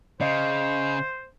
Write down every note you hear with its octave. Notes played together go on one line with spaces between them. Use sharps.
C#3 C5 D5 D#5 F5